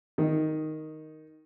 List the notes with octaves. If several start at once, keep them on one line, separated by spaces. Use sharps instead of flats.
D#3 D#4